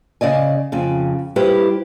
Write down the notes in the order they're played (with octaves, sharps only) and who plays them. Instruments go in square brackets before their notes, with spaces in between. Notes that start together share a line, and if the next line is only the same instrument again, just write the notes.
[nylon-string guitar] C#3 D5 D#5 G#5
F2 C#3
G3 E4 G4 B4 C5 F5